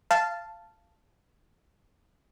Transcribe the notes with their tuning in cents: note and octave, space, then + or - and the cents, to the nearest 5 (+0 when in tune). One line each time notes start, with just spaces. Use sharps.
F5 -15 A5 +0